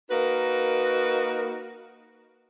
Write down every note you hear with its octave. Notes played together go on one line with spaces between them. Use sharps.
A#3 D#4 F#4 A#4 B4